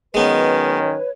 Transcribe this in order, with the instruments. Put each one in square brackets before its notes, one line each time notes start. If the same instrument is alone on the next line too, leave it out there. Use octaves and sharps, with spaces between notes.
[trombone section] D#3 F#3 C#4 [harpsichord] G#3 B3 [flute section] B4 C#5